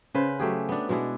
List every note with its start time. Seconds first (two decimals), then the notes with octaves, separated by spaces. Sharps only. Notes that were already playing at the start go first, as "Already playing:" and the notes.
0.14 C#3 B4 C5
0.39 F#3 A3 G4 G#4
0.69 B3 D4
0.89 B2 G#3 D4 E4